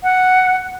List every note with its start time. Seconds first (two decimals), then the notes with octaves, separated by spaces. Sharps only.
0.03 F#5